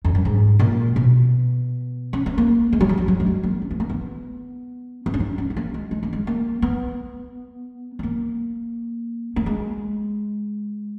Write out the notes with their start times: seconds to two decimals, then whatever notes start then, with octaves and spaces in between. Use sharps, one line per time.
0.05 F2
0.15 F#2
0.25 G#2
0.59 A#2
0.96 B2
2.13 C#4
2.26 B3
2.38 A#3
2.73 G#3
2.81 F#3
2.89 F3
2.98 F#3
3.08 F#3
3.20 G#3
3.26 F#3
3.43 A#3
3.62 C#4
3.71 B3
3.80 A#3
3.90 B3
5.06 B3
5.14 C#4
5.20 D#4
5.38 C#4
5.50 B3
5.57 A#3
5.74 G#3
5.91 G#3
6.03 A#3
6.13 G#3
6.27 A#3
6.62 B3
7.99 B3
8.03 A#3
9.36 A#3
9.46 G#3